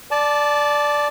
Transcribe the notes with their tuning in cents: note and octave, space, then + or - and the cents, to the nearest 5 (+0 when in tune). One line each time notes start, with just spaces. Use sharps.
D5 +0 A5 -20